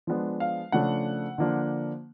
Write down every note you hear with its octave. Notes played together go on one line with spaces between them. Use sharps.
F3 G#3 B3 D4
F5
C#3 F3 A3 D4 F#5
D3 F3 A#3 D4